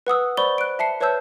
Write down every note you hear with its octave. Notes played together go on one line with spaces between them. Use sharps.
B4 F#5 D#6 E6
C5 D5 B5 C#6 G7
F#6 D7
E5 A5 C7 C#7
B4 C#5 E5 A5 E6 G6